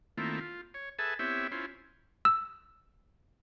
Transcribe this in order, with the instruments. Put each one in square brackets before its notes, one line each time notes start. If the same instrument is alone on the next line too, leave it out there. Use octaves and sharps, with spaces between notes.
[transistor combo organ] D#3 A3 A#3 C4 E4 F4
F4
C#5
G#4 A4 B4 E5 G#5 A5
B3 C4 E4 G4 C#5 E5
C#4 E4 F4 C5
[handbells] E6